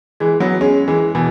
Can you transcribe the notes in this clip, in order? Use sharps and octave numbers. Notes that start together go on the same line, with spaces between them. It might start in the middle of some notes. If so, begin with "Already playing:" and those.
E3 G#3
F#3 B3
G#3 C#4
E3 G#3
B2 E3